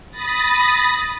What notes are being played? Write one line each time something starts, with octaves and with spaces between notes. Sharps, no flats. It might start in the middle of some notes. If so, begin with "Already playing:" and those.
B5 D#6 A6 A#6